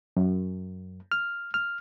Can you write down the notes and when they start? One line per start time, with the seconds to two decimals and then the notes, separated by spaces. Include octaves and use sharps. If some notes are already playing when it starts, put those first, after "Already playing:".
0.17 F#2
1.12 F6
1.54 F6